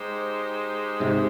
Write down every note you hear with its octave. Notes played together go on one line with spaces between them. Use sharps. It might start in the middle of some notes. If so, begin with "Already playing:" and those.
Already playing: G#3 D#4 G4 C5
G#2 C3